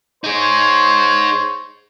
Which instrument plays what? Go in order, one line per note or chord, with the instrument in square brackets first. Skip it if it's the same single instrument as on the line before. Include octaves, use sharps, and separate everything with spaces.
[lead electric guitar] D#4 G#4 [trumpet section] C5 C#5